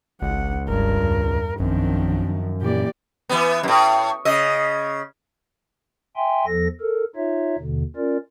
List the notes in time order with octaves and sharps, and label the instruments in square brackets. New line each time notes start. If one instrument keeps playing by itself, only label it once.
[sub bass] G#1 [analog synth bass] C#2 [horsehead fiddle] F#5
[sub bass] F#1 [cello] G2 [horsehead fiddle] A#4
[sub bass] E2
[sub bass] A#1 [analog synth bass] F#2 [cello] D#3 F3 [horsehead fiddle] C4 D4
[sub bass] A#2 [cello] E3 A#3 [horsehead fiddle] G4 D5
[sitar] E3 B3
F#2 A2
C#3 D#5
[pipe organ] E5 G5 G#5 C6
E2 F3 A4 A#6
A4 A#4
D#4 F4 C#5 E5
D#2 B2 D3
C#4 F4 A#4 D5